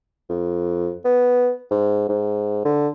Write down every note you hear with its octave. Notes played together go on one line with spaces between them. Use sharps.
F2
B3
G#2
G#2
D3